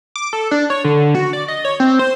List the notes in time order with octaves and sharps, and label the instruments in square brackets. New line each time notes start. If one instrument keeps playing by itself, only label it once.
[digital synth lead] D6
A4
D4
C#5
D3
F#4
D5
D#5
C#5
C4
C5